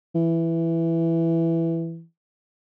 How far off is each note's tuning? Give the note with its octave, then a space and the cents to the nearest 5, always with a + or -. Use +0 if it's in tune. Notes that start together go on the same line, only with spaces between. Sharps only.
E3 +5